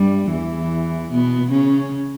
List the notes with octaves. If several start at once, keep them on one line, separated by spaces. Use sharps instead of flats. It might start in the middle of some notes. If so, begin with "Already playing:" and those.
Already playing: G2 G3
E2 E3
B2 B3
C#3 C#4